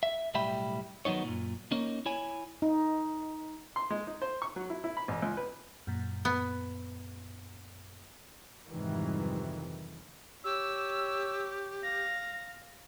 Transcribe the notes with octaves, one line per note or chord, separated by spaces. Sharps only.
E5
B1 A2 G3 E5 G5 B5
D#3 F#3 B3 D#4 C#5
F#2 A#2
A#3 C#4 D#4
E4 C#5 G#5
D#4
C6
G#3
D#4
C5
C#6
F#3
E4
E4
B5
A1
C#2
B4
F#2 A#2
B3
F2 G#2 C3 D#3 E3 G3
G4 C#5 E6
F5 A#6